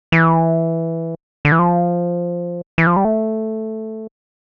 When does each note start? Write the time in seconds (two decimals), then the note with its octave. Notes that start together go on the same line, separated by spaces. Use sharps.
0.12 E3
1.45 D3
1.52 E3
1.59 F3
2.78 E3
2.87 F3
2.96 G3
3.05 A3